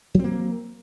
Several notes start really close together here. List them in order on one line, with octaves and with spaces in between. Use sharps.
F#3 C4 A#3